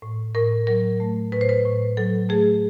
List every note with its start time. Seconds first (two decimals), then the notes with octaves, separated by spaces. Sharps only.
0.02 A2
0.35 A2 A#4
0.67 F#3 A#4
1.00 A3
1.32 A2 B4
1.41 C5
1.49 B4
1.65 A2
1.97 F#3 A4
2.29 A3 G#4